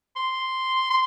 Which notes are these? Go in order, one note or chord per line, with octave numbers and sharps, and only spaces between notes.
C6
C6